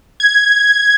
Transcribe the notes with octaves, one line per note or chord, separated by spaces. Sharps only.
G#6